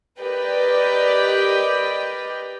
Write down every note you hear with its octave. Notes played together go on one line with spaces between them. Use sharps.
G4 A#4 B4 D5 D#5 G5